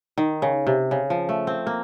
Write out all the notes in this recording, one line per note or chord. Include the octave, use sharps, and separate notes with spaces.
D#3
C#3
C3
C#3
F3
A3
C4
A#3